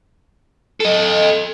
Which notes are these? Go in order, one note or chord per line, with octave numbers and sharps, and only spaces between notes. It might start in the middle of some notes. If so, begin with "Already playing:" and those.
A4 D#5